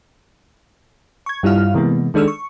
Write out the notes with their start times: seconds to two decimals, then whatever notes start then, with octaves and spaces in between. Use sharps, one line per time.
1.26 C#6 G#6
1.43 G2 G3 E4 F4 F5 F6
1.74 C3 E3 G#3 A#3 B3
2.14 D#3 G#3 D4 A4 E6 F6
2.28 C#6